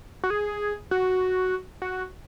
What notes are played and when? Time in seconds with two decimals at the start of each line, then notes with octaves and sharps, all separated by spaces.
0.24 F#4
0.30 G#4
0.91 F#4
1.82 F#4